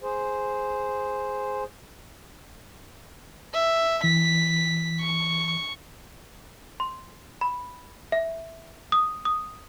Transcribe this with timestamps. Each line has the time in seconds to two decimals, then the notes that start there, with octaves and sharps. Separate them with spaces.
0.01 G#4 C5
3.54 E5
4.04 E3 B6
5.00 C#6
6.80 C6
7.41 B5
8.12 E5
8.92 D#6
9.25 D#6